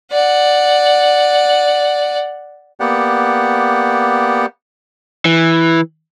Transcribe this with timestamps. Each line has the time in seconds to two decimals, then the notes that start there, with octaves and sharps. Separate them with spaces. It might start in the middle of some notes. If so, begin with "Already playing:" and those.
0.12 D5 F#5
2.80 A#3 B3 G4 D5 F#5
5.25 E3